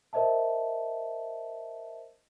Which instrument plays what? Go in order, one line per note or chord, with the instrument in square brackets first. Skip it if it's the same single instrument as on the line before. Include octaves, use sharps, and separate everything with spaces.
[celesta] A#4 C5 D#5 E5 A5